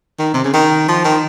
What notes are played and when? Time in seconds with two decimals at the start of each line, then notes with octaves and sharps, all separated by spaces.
0.19 D#3
0.34 C3
0.44 C#3
0.53 D#3
0.88 F3
1.04 D#3